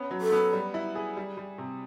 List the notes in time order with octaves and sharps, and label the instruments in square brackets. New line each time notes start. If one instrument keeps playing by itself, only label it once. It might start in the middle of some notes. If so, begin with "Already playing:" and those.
Already playing: [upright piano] B3 C#4
F#3
[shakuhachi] A4
[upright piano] B3
G3
E4
G#4
G3
G3
C3